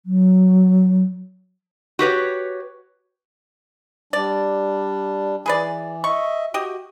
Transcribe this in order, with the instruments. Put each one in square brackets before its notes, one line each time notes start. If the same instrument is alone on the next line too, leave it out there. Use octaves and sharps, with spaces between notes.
[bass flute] F#3
[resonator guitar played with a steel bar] F#4 G4 B4 C#5
[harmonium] G3 D4 [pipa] D5
[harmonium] E3 [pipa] G#4 B4 D5
[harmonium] D#5 E5 [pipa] C#6
[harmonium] F#4 [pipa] G4 D#5